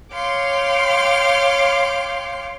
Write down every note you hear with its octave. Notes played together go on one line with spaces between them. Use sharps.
C#5 F5 G5 C6 D6 F6